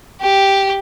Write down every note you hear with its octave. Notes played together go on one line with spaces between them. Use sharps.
G4